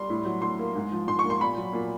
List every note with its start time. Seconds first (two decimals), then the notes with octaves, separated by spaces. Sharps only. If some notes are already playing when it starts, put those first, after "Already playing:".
Already playing: G3 C6
0.10 A2
0.25 F#3
0.42 A2 C6
0.59 A#3
0.75 G#2
0.92 F3
1.07 G#2 C6
1.19 C#6
1.24 A#3
1.30 C6
1.40 A#2 B5
1.58 F#3
1.73 A#2